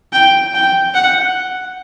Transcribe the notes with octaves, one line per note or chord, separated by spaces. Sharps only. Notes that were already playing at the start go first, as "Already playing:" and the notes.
G5
G5
F#5